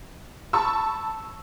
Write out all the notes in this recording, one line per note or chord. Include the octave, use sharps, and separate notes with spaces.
A5 B5 C#6 E6